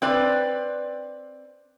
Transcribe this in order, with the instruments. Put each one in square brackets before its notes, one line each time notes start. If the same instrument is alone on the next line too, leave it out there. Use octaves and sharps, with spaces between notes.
[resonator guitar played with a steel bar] C4 B4 D5